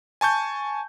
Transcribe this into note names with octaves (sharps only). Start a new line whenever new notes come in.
G#5 A5 C#6 G6